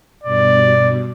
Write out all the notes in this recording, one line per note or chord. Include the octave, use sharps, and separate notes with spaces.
G2 B2 D5